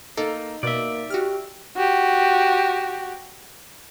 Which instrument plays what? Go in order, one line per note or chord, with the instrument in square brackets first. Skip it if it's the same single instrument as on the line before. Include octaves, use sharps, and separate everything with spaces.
[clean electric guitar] A#3 [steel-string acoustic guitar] D#4 [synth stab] A4
[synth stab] B2 [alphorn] A#3 [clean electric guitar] D5 E5
[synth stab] F#4 F6 [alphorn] G4
[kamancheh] F#4 G4